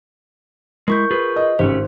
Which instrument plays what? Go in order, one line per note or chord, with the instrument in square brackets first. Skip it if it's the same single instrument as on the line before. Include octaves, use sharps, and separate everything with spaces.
[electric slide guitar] G#3 E4 [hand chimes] A#4 C#6 G6
[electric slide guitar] F4 G#4 B4
[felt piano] D#5
[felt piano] G#1 [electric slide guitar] A3 C#4 G4 [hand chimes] C5